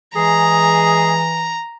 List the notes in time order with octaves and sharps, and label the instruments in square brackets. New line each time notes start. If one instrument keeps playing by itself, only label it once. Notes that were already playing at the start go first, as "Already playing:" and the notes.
[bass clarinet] E3 [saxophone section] G#3 G#4 [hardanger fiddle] A#5